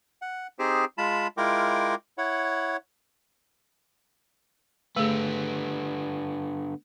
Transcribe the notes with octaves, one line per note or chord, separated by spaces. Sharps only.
F#5
C4 D#4 G4 G#4 C5
G#3 F4 A5 B5
G#3 E4 F4 A#4 G5 D6
E4 C#5 F#5
D3 A3 B3 G#4